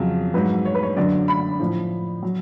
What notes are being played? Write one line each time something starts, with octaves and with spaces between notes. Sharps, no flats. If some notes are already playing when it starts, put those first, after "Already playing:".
Already playing: F2 C#3 F#3
G#2 F#3 B4
C#5
B4
C#5
F#2 D3 F#3 D5
B5
A2 F3
F#3